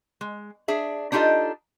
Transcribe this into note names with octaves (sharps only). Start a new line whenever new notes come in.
G#3
D4 G#4 E5
D4 D#4 F4 G4 A4 D#5